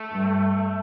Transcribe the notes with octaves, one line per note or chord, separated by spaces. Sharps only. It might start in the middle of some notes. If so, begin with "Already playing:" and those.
Already playing: A3
G2